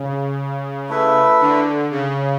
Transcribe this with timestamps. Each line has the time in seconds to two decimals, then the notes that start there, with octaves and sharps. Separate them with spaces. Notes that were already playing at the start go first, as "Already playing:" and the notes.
Already playing: C#3
0.89 A3 E4 B4 E5
1.40 D3
1.91 C#3